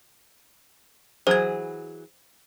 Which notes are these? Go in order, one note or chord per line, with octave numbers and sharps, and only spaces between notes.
E3 F#3 G#4 C5 G#6